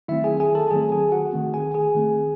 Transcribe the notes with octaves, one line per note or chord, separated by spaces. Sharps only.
D#3 F#3 A3 C4 E4 E5
G#4 G#5
G#4 G#5
A4 A5
D#3 F#3 A3 C4 G#4 G#5
G#4 G#5
F#4 F#5
D#3 A3 C4
G#4 G#5
G#4 G#5
D#3 A3 C4